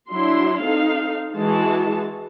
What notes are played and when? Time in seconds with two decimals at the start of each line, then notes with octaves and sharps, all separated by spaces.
0.12 F#3 D4 E4 C6
0.63 C4 D#4 A4 F5
1.35 E3 G#3 F#4 A5